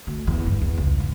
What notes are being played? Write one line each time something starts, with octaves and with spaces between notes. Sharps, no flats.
D2
E2
G2
E2
C#2
G#2